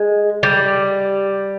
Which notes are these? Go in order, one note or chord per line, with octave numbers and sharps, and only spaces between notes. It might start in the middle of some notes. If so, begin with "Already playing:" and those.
Already playing: G#3
G3